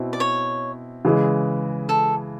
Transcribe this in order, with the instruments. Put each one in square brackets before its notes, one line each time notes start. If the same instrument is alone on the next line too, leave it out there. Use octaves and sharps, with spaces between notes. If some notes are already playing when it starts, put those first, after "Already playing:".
Already playing: [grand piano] B2 C4 E4
[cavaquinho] D5
C#5
[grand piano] C#3 E3 G#3
[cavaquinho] A4